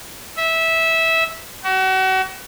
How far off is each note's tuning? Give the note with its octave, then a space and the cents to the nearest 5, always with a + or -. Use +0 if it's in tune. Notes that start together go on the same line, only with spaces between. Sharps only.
E5 -15
F#4 +35